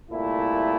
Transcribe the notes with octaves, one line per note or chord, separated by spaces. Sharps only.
C2 A#2 A3 E4